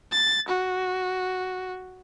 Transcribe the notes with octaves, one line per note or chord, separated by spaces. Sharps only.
A6
F#4